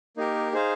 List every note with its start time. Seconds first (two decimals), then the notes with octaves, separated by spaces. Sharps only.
0.17 A#3 D#4 G4 A#4
0.52 D#4 G#4 C5 F5